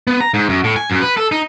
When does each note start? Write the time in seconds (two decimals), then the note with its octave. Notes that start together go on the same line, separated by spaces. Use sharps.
0.07 B3
0.21 A#5
0.34 G#2
0.49 F#2
0.64 A2
0.76 G#5
0.90 F#2
1.02 B4
1.17 A4
1.32 D#4